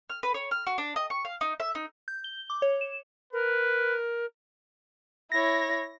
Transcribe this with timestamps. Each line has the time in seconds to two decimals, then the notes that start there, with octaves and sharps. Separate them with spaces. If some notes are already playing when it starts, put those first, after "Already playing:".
0.09 F6
0.23 B4
0.34 C#5
0.51 F6
0.67 F#4
0.78 D4
0.96 D#5
1.10 C#6
1.25 F5
1.41 D#4
1.60 E5
1.75 D#4
2.08 G6
2.24 G7
2.50 D6
2.62 C#5
2.81 E7
3.33 A#4 B4
5.32 E4 C#5 A#6